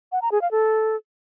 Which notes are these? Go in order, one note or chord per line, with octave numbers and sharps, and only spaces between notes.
F#5
A#5
G#4
F5
A4